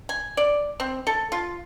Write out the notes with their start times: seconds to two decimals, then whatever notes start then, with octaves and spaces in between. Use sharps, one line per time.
0.09 G#5
0.37 D5
0.80 C4
1.07 A4
1.32 F4